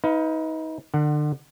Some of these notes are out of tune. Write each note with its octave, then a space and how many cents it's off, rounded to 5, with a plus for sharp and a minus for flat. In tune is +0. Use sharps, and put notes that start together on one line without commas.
D#4 +30 B4 +5 F5 +0
D3 +35 F#5 +10